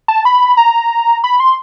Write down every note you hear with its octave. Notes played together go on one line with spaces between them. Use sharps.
A5
B5
A#5
B5
C6